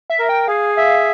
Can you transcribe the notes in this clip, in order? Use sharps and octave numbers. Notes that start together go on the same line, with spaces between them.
E5
A#4
G5
G#4 F5
E5